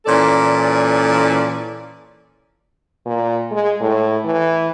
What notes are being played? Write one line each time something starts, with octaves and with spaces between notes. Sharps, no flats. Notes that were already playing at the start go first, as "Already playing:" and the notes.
A#2 E3 C#4 A4 D5
A#2
G#3
A2
E3